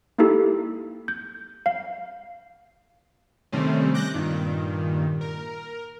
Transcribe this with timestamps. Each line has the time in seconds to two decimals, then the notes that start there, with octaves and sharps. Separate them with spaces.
0.18 A#3 D#4 E4 G4 A4
1.08 G6
1.66 F5
3.52 C3 D#3 G3 A3 C4 C#4
3.94 D6 F#6 G6 A#6
4.14 G2 A#2 D#3
5.21 A#4